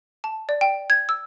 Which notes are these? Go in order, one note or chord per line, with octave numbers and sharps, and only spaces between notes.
A5
D5
G5
G#6
E6